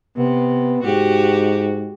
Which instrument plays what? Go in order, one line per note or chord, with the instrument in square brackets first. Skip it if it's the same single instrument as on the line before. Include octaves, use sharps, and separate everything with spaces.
[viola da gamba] C3 [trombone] B3
[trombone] G#2 [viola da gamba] F#4 G4